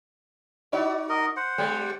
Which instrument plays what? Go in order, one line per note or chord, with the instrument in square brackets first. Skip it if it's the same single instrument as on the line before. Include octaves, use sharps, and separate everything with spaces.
[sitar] D#4 F#4 D5
[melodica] A#4 D#5
C5 F#5
[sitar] G3 G#3